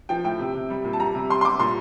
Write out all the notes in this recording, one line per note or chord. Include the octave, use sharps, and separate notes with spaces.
F3 G5
A2 G5
C3
C3
G3
A#2
A5
G3 A#5
C3
G3 C6
C6
G3 D6
A#2 C6